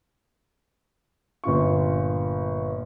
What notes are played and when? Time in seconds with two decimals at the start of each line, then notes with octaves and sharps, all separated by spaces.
1.44 G1 A#2 F4 C#6